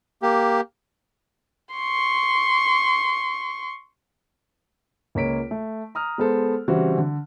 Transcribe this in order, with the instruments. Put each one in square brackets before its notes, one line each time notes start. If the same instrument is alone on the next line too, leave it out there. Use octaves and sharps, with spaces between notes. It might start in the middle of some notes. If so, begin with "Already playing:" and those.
[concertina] A#3 G4
[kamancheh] C6 C#6
[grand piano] C#2 A#3 C#5 B6 D7
A3
A#5 D#6 F6
G#3 B3 A4 C5
C#3 E3 G3 C4 E4 F#4
D3